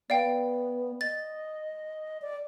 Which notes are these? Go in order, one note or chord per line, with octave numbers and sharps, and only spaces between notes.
B3 D5 F5 G5
D#5 A6
D5